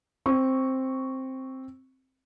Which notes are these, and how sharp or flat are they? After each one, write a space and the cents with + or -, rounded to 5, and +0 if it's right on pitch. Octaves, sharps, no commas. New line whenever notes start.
C4 +5 C#6 +0